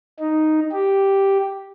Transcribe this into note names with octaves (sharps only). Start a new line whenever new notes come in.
D#4
G4